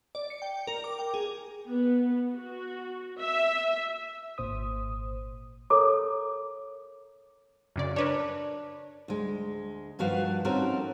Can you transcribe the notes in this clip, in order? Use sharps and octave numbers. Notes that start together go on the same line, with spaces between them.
D5
C#7
G5
A#4
D6
G5
G#4
B3
F#4
E5
G#1 A#2 C5 D#6
A4 A#4 C#5 A#5 D6
F#2 C#3 D5
D4 A#4 B4 C#5
D2 G#3
G2 D#3 F3 F#4 B4 F5
C4 C#4 D#4 F#4 A4 A#4